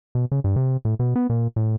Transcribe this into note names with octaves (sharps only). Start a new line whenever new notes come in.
B2
C#3
G2
C3
A2
B2
B3
A#2
A2